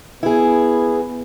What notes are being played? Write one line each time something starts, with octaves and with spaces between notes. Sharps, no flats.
B3 E4 G#4